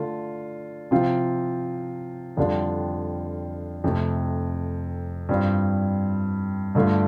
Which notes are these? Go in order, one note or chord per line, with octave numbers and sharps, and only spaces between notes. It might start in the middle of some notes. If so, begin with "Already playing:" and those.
Already playing: D3 A3 F4
C3 F3 C4 F4
F2 D3 G3 D4 F4
F2 C3 A3
G2 G3 C4 F4
G2 D3 A3 F4